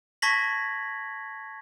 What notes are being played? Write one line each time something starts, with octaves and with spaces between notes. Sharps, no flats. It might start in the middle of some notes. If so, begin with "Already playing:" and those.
A5 C#6 G#6 A#6 B6 F#7